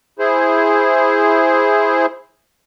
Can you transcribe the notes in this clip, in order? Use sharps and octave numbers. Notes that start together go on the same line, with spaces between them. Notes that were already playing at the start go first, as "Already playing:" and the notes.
E4 G#4 C5